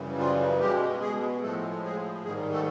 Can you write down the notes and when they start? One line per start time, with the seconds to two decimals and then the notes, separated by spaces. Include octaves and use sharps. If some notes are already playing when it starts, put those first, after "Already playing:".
Already playing: F#2 C#3 E3 G3
0.19 F3 F4
0.59 B2 G3 G#3 G4
1.01 G#3 G#4
1.42 A2 F3 G#3 A3 A4
1.84 G#3 G#4
2.24 G#2 D#3 G3 G#3 G#4
2.52 A3 A4